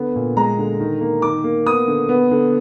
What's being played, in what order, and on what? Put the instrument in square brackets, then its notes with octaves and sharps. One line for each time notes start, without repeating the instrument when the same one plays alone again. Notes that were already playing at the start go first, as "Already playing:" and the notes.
Already playing: [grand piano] D3 B3
A#2
G#3 A#5
D3
D#3
A#3
D#3 D6
A#3
B3 D#6
D3
B3
D3